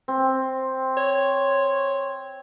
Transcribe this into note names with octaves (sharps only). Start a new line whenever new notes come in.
C4
C#5